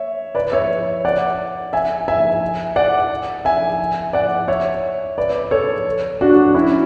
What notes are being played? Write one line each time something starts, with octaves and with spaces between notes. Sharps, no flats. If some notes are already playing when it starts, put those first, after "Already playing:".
Already playing: C#5 E5
B4 D5
C#5 E5
D5 F#5
E5 G#5
E5 G#5
D5 F#5
E5 G#5
D5 F#5
C#5 E5
B4 D5
A4 C#5
D4 F#4
C#4 E4